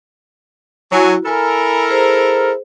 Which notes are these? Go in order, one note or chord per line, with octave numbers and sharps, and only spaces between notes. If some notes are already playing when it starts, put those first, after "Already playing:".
F#3 E4 F#4 G#5
E4 A4 A#4 G#5 B5
G#4 C5